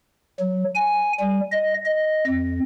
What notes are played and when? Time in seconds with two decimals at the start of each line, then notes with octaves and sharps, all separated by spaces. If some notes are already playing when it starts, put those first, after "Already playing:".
0.39 F#3
0.76 G#5
1.20 G3
1.51 D#5
1.85 D#5
2.27 F2